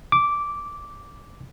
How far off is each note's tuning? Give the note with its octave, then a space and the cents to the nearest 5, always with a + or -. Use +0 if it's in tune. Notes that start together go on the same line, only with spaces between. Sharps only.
D6 -10